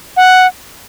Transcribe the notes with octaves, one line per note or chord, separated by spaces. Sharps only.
F#5